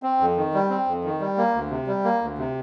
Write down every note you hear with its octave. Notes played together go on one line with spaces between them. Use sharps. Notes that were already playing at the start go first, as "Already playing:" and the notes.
C4
F2
D#3
G3
C4
F2
D#3
G3
A#3
D2
C3
G3
A#3
D2
C3